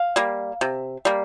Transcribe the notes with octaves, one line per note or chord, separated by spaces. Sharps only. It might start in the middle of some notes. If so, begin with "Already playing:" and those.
Already playing: F5
G3 A#3
C3
G3 A#3